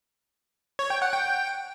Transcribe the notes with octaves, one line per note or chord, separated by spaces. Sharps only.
C#5
G5
F#5
G5